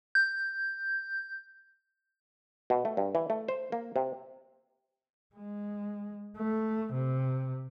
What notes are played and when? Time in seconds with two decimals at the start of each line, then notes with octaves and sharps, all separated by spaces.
0.15 G6
2.70 B2
2.85 A3
2.97 G2
3.15 E3
3.30 A3
3.49 C5
3.72 A#3
3.96 C3
5.36 G#3
6.37 A3
6.94 C3